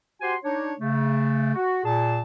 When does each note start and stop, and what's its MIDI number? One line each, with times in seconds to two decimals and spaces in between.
0.22 0.36 66
0.22 0.36 67
0.22 0.36 72
0.22 0.36 80
0.22 0.36 84
0.44 0.74 62
0.44 0.74 63
0.44 0.74 73
0.80 1.53 49
0.80 1.53 57
1.55 1.83 66
1.84 2.21 46
1.84 2.21 68
1.84 2.21 81